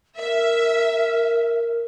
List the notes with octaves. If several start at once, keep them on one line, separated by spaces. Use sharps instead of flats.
A#4 E5